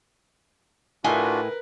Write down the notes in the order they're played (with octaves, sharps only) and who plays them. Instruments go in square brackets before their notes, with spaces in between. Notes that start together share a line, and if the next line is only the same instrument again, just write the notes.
[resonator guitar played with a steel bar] A2 D#5 G#5 [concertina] D4 F4 F#4 [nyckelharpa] A#4 B4